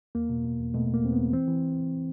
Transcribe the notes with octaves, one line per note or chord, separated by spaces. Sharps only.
E2 A#3
B2
B2
E2
B2 A3
B2
A#3
E2 C4
B3
E2
E3 C4
E3